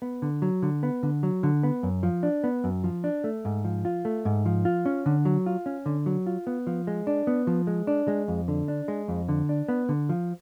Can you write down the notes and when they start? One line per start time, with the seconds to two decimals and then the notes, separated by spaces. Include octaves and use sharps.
0.02 B3
0.22 D3
0.42 F#3
0.62 D3
0.83 B3
1.03 D3
1.23 F#3
1.43 D3
1.63 B3
1.83 F#2
2.03 F3
2.23 D4
2.44 B3
2.64 F#2
2.84 F3
3.04 D4
3.24 A3
3.45 G#2
3.65 F3
3.85 F4
4.05 A3
4.25 G#2
4.46 F3
4.65 F4
4.86 C#4
5.06 D3
5.25 F#3
5.46 F4
5.66 C#4
5.86 D3
6.06 F#3
6.26 F4
6.47 B3
6.67 F3
6.87 G#3
7.07 D4
7.27 B3
7.47 F3
7.67 G#3
7.87 D4
8.08 G#3
8.28 F2
8.48 D3
8.68 D4
8.88 G#3
9.08 F2
9.28 D3
9.49 D4
9.68 B3
9.89 D3
10.09 F3